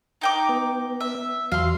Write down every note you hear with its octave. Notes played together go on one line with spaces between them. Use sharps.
D#4 G5 D6
B3
E5
E2 F#3 F5 C6